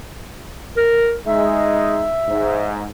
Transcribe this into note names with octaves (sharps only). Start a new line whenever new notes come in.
A#4
G#3 D#4 E5
G#2